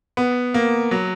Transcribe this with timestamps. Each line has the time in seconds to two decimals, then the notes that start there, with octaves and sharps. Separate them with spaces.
0.17 B3
0.54 A#3
0.91 F#3